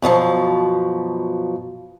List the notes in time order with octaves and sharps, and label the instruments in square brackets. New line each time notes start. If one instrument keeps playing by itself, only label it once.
[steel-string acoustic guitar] F#2 B2 D3 F3